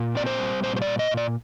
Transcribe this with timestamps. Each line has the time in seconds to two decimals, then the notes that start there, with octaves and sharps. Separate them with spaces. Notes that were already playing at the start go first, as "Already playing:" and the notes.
Already playing: A#2
0.15 C4 D5
0.26 C5
0.39 G3
0.63 A#2 C5
0.76 C5
0.82 D5
0.87 A#2
0.99 D#5
1.11 A#2
1.17 D5